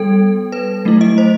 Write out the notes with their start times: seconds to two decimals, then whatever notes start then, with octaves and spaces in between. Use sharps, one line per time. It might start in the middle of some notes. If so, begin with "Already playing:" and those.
Already playing: G3 B3 A4 G5
0.52 B4
0.85 F#3 A3 E4
1.01 D#5
1.18 C5